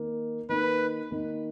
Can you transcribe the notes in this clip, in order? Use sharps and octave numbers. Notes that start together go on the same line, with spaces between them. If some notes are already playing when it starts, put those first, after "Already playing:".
Already playing: D#3 A#3 D#4
D#3 A#3 D#4 B4
D#3 A#3 D#4